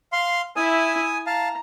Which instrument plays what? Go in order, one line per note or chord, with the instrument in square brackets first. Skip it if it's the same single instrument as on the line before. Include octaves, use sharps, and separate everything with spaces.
[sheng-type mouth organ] F5 C6
[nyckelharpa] E4 E5 [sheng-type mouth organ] G#5 D#6
[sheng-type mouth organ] F5 A5 [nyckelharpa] A#5